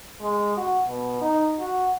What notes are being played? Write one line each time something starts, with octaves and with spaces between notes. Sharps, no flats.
G#3
F#4
B2
D#4
F#4